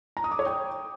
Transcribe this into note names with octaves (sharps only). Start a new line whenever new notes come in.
A#5
D#6
D6
C#5
G5